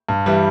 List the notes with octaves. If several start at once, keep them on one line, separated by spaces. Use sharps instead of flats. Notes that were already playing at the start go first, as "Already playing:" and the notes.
G2
E3 G3